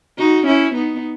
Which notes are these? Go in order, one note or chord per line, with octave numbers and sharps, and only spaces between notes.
D#4 F#4
C#4 E4
B3 D#4